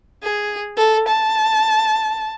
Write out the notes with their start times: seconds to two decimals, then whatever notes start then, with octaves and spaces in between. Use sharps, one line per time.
0.24 G#4
0.77 A4
1.08 A5